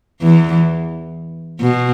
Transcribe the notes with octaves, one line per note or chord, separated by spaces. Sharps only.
E2 E3
B2